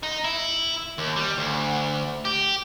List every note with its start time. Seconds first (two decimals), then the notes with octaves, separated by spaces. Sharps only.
0.03 D#4
0.24 E4
0.98 D#2
1.16 G3
1.38 D2
2.25 G4